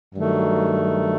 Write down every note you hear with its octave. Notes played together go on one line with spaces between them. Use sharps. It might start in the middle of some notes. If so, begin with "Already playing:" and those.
G2 D#3 F#3 A3